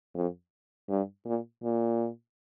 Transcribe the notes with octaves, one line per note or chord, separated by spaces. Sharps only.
F2
G2
A#2
A#2